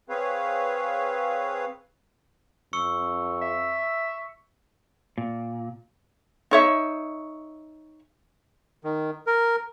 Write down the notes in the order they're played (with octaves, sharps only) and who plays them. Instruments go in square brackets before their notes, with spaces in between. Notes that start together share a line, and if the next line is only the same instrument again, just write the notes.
[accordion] C4 G#4 B4 C#5 F5
[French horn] F2 [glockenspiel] C#6 E6 C#7
[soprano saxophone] E5
[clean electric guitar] A#2
[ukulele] D#4 C#5 E5
[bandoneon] D#3
A#4